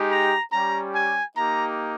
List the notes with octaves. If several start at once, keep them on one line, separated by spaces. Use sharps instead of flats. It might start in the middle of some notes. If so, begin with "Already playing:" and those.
Already playing: G#3 D#4 G4
A#5
G3 C#4 G4 A#5
G#5
A#3 D#4 G4 A#5